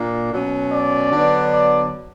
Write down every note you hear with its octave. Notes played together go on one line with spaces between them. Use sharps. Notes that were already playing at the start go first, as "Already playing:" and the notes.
Already playing: A#2 A#3 D4
B2 F#3 C#4
D5
D3 F#3 B3 D4
D5